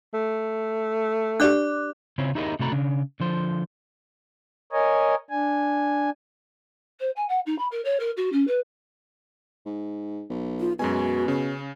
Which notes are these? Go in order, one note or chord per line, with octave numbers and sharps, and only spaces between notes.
A3
D4 G4 D5 D6 F#6
C#3 C4 C#4 E4 F4
D#4 E4 G4 G#4 A#4 D#5
C3 A3 F#4 A4 A#5 B5
C#3 D4
D3 F3 C5
A#4 C#5 D#5 G#5
D4 G#5
C5
G#5
F#5
D#4
B5
A#4
C#5
A#4
F#4
C#4
B4
G#2
B1
F4
F#2 B2 G#3 F#4 G#5
C#3 C#4